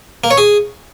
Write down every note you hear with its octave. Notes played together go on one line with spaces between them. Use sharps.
A#3
C#5
G#4